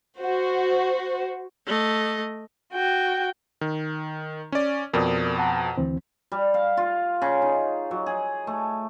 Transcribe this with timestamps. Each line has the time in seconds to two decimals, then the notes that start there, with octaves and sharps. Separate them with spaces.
0.19 F#4 C5
1.66 A3 D#5
2.73 F#4 G5
3.61 D#3
4.52 C#4 D5
4.94 F2 B2 A#4 D5 D#6
5.38 F#5 A5 A#5
5.77 D2 E3 C4
6.32 G3
6.54 F5
6.77 F4
7.22 C#3
7.42 D#4
7.91 F#3
8.06 G#4
8.47 A3